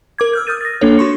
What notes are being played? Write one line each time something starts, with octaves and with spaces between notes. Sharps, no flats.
A#4 D6 G#6
E6 F6 G6
D#6 F6 G6 A6 D#7
A6 A#6
A#3 D4 A4 C#5
F#4 C6 C#6 C#7